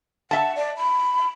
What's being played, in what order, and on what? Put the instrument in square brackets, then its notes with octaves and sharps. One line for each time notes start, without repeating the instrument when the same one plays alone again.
[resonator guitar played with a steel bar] E5 A5 [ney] F#5
[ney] D5
B5